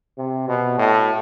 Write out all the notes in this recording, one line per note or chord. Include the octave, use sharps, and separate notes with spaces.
C3
B2
A2